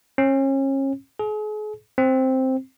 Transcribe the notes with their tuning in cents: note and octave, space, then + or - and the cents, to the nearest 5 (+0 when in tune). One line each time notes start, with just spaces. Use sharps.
C#4 -35
G#4 +40
C4 +0